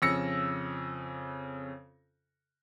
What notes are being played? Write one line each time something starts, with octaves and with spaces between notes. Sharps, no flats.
F2 C#3 E6 A#6 C#7